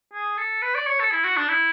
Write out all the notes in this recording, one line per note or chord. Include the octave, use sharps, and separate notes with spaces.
G#4
A4
B4
D5
C#5
A4
E4
F#4
D4
E4